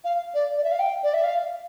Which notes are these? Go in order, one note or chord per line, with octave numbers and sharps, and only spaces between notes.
F5
D5
D5
E5
F5
G5
D5
E5
F5